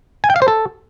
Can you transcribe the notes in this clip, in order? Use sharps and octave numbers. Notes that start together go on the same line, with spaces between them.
G#5
G5
F5
C5
A4